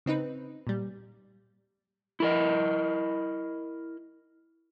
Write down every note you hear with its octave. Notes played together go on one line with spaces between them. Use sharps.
C#3 C4 D#4 B4
A#2 G3
E4 A#4 D#5